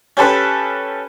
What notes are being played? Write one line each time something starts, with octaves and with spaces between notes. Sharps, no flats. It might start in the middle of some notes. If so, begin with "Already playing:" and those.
C#4 G4 A4 B4